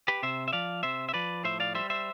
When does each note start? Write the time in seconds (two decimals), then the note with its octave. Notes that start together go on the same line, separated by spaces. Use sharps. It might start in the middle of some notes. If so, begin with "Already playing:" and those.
0.08 G4 B4
0.23 C3 C5 E5
0.48 E5
0.53 F3 D5 F5
0.83 C3 C5 E5
1.09 E5
1.14 F3 B4 D5
1.44 A2 C5 E5
1.60 D5 F5
1.75 G3 C5 E5
1.90 C5 E5